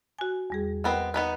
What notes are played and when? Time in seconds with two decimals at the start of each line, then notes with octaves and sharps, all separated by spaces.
0.19 F#4 G#5
0.50 E2 G3 G#4
0.84 G#3 B3 C4 A#4 B5
1.14 B3 D#4 B4